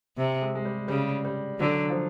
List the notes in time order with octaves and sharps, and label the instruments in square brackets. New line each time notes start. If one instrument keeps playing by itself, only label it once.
[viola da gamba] C3
[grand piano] G#3
G#3
G3
[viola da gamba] C#3 [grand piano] G3
[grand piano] G3
[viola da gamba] D3 [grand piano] F#3
[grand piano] F3